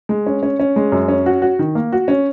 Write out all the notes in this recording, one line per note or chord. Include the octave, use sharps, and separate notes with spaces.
G#3
C#4
C#4
C#4
G#3
F#2
C#4
F#4
F#4
D#3
A#3
F#4
C#4